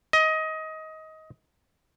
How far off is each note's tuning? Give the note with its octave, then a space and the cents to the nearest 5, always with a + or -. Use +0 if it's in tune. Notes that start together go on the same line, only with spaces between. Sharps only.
D#5 +20